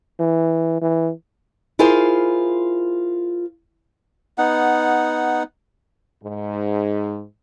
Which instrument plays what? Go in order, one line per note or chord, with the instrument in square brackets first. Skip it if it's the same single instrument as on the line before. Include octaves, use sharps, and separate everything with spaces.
[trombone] E3
E3
[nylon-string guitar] E4 F4 G#4 A#4 C5
[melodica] B3 D#4 F#5
[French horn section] G#2